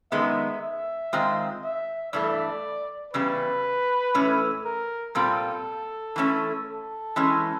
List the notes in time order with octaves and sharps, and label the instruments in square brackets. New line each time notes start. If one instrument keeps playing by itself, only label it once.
[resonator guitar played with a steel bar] F#2 D#3 G#3 B3 [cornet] E5
[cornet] E5
[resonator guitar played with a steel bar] D#3 G#3 C4 F4
[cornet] E5
[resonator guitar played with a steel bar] G2 E3 A3 [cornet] D5
[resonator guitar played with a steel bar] E2 C#3 G3 [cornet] B4
[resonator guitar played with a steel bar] A2 E3 A3 C#4
[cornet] A#4
[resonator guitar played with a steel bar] A#2 G3 C4 F4 [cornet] A4
[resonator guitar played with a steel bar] E3 A3 C#4
[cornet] A4
[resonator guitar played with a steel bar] E3 G#3 C#4